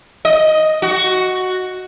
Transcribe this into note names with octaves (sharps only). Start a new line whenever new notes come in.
D#5
F#4